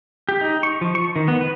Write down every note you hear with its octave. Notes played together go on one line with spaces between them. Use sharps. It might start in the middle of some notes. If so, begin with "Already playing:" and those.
G4
D#4
C#6
F3
C#6
D#3
B3
B4